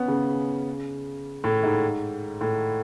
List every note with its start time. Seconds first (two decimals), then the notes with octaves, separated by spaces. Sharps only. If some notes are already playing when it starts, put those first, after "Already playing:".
Already playing: B3 C#4
0.08 C#3
1.44 A2
1.63 G#2
2.41 A2